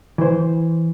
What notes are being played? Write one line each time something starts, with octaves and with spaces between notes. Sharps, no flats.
E3 C5